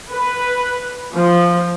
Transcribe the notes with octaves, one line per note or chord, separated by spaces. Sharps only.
B4
F3